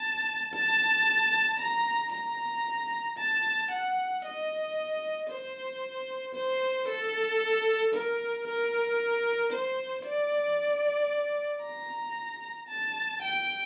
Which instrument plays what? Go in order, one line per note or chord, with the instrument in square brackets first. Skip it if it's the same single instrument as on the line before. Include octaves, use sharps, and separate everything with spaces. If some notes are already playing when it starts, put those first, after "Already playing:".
Already playing: [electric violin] A5
A5
A#5
A#5
A5
F#5
D#5
C5
C5
A4
A#4
A#4
C5
D5
A#5
A5
G5